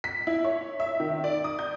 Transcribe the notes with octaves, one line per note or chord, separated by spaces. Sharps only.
B6
E4
C#5
E5
D#3
D5
D#6
G6